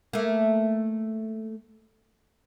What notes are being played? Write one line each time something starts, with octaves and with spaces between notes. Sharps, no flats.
A3 A#3